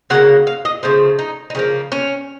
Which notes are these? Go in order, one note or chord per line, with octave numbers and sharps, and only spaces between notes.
C#3 F#3 A#3 F#5
F5
D#5
C#3 F3 A3 C5
D#4
D#4
C#3 F3 A#3 C#4
C#4